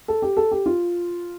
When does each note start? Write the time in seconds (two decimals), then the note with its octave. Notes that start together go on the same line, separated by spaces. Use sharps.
0.08 A4
0.22 G4
0.37 A4
0.51 G4
0.66 F4